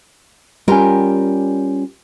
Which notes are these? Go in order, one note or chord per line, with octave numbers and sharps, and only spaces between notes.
G3 C#4 F4 G4 A#4